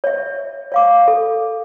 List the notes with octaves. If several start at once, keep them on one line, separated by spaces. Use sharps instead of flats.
C#5 E5
C#5 F5 D6
A4